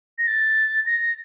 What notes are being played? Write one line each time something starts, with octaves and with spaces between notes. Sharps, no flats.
A#6
A6
A#6